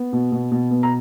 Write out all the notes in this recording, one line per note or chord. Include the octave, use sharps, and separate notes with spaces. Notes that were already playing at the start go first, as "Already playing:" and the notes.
Already playing: B3
B2
B2
B2
B3
A#5